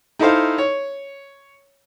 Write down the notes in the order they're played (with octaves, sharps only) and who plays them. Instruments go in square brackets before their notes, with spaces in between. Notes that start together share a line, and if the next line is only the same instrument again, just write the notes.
[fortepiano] D#4 E4 A4 C5 F5
C#5